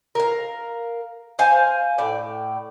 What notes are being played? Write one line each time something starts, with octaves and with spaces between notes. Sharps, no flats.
A#4 F5
C5 F5 G#5
A2 D5